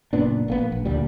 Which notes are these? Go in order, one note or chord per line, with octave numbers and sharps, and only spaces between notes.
F#1 A#2 B3 D4
A#1 A#3 B3
A#1
D2 A#2 G3